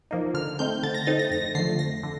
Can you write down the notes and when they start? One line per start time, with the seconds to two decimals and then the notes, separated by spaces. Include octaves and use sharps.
0.11 F3 A#3 D#4
0.34 D3 F6
0.59 A3 C4 D#4 G6
0.83 D3 A6
0.94 A#6
1.07 A3 C4 D#4 A6
1.19 A#6
1.31 F2 A#6
1.55 D3 F3 A3 C7
1.79 F2 A#6
2.03 D3